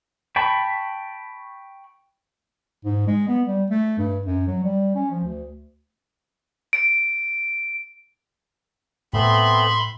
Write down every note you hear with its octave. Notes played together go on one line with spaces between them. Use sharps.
G5 A5 B5 C#6
G#2
G#3
B3
G3
A3
G2
F#2
F#3
G3
C#4
F3
D2
D7
A2 A3 B3 C4 E5 B5 C6